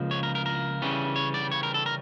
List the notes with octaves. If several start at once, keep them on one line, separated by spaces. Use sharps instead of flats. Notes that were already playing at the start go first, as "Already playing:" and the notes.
Already playing: C#2 C#3 F3 A#3
C#5
A#4
A#4
A#4
C#3 E3 G3 C#4
C#5
D5
C#5
A#4
A4
A#4